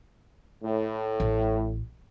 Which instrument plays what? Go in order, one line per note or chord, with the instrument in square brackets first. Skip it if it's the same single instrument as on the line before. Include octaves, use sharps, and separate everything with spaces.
[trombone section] A2
[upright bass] A1